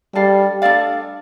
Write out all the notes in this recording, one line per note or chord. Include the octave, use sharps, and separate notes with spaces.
G3 D4 A4 D5 F5
D4 A4 D5 F5